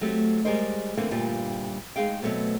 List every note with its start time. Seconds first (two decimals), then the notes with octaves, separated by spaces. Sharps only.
0.01 F#3 A3 C4 G4
0.45 G3 G#3 G#4 A#4 C5 D#5
0.97 D3 E3 A3 A#3 C4
1.11 D2 G2 A#2 G3 F4
1.96 G#3 D#4 G#4 F5 G5
2.22 B2 F#3 A3 B3 C4